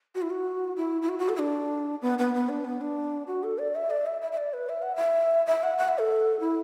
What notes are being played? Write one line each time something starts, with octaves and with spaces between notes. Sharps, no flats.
F#4
E4
F#4
E4
E4
F#4
F#4
A4
E4
D4
B3
B3
B3
D4
B3
D4
F#4
A4
D5
E5
D5
E5
E5
E5
D5
B4
E5
F#5
E5
E5
F#5
F#5
E5
A4
E4